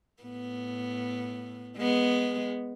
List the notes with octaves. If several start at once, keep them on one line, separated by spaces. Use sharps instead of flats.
A2 B3
G#3 B3